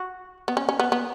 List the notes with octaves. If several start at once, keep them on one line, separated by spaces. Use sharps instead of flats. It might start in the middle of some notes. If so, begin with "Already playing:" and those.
Already playing: F#4
B3
C#4
C#4
B3
B3